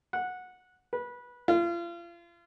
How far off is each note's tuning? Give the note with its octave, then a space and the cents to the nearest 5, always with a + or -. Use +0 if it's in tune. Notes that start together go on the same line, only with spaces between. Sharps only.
F#5 -15
B4 -20
F4 -35